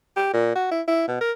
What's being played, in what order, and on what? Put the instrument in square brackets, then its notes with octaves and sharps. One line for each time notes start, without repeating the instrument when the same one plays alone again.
[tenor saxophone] G4
A#2
F#4
E4
E4
B2
A#4